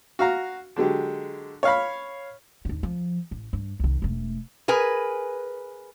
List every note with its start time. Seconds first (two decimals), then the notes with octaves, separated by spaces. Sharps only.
0.19 F#4 F5 A#5
0.76 D3 F#3 G#3 G4
1.63 C#5 F5 B5
2.65 D#2 D3
2.83 F3
3.31 A1
3.53 G2
3.80 C2 D#3
4.02 E1 A3
4.68 G#4 A#4 B4 G#5